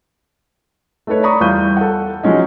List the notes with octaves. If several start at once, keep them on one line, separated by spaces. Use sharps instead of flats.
A3 D#4 A4 B4 C#5
D5 A#5 B5 C#6 D#6
E2 G3 F4 F5 G6 D#7
A4 F#5
F3 F#3 G#3 C#4 D#4